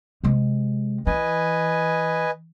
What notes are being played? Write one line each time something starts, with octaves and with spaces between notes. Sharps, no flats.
C3 G#3
E3 B4 D#5 G#5